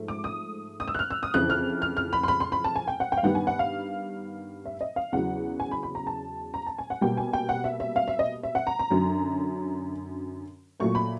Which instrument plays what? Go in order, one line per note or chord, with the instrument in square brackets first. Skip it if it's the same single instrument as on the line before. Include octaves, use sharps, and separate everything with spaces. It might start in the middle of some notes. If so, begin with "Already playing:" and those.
Already playing: [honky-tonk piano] G#2 F3 A3
D6
D#6
D#6
E6
F#6
F6
E6
D#6
F2 C#3 E3 F#6
F6
F6
F6
B5
C6
B5
C6
B5
A5
G#5
G5
F#5
G5
F5
G2 D#3 G3 B3 F#5
G#5
F#5
F5
E5
D#5
F5
E2 C#3 F#3 F#5
G#5
B5
B5
A#5
A5
A#5
A5
G#5
F#5
B2 G3 A#3 G5
G#5
G5
F#5
E5
E5
F5
E5
D#5
E5
F#5
A#5
A#5
F#2 D3 F#3
A#2 F#3 A3 C#6
B5